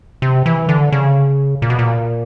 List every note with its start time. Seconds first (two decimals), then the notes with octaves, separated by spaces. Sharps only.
0.22 C3
0.46 E3
0.69 D3
0.92 C#3
1.62 A#2
1.70 B2
1.79 A#2